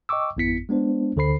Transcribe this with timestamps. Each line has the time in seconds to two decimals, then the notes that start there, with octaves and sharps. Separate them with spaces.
0.09 D#5 G5 C#6 D6 E6
0.37 G#1 F2 B3 E4 B6 C#7
0.69 G#3 B3 D4 C5
1.16 D2 D3 A4 C5 B5 C7